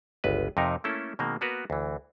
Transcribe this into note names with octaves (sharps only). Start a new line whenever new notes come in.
G1 C#2 B4
F2 C3 D#4 A#4
A3 A#3 C#4 E4 A4
B2 D#3 G#3 A#3 C4
A#3 B3 F#4 A#4 B4
D2 E3